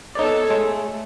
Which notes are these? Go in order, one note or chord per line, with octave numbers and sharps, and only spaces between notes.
B3 D#4 A4 C#5 D5
G#3 A3